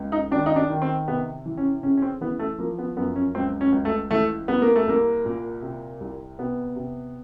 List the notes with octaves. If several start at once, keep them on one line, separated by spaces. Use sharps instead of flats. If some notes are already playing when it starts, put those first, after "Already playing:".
Already playing: C#2
D#4
D#3 D4
D#4
D4
D#3
C4
C3 B3
E3
C#4
C#3 C#4
C#4
C4
E3 B3
A3
F3 A#3
B3
F#2 B3
C#4
C#2 C4
C#4
C#2
A3
E3 A3
C2 B3
A#3
A3
C2 A#3
A#2
C3
C2
C3 B3
C3